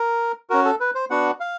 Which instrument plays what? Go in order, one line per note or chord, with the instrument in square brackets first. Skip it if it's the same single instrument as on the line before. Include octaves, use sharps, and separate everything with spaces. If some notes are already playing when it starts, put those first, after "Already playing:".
Already playing: [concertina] A#4
C#4 F#4 A#4
A4
B4
C5
B3 D4 F#4 F#5
F5